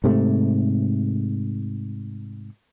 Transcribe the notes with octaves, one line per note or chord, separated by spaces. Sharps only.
G#2 C3 A3